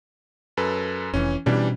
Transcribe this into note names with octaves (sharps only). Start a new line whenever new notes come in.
F#2 A4 B4
F1 E3 C#4
B2 E3 G3 C#4 D4